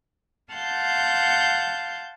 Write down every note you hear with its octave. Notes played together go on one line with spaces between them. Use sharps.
F5 F#5 A5 C6 G6